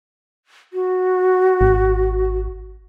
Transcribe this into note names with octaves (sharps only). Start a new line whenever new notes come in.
F#4
G#1